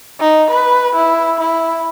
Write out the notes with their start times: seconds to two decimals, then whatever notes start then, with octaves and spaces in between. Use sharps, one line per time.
0.20 D#4
0.50 B4
0.95 E4
1.40 E4